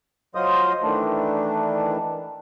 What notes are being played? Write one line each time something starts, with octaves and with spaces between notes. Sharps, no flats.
F#3 F4 C5 D#5 D#6
D#3 E3 A3 D4